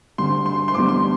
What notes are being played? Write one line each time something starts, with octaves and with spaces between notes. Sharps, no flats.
D2 D3 G3 C6
C6
C6
E2 D3 G3 D6
C6